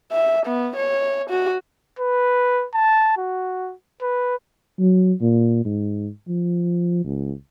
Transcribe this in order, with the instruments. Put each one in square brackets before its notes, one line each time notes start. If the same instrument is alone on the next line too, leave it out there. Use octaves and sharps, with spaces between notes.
[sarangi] E5
B3
C#5
F#4
[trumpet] B4
A5
F#4
B4
[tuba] F#3
A#2
G#2
F3
C#2